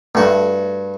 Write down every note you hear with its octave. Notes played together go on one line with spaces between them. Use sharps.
G2 A3 F#4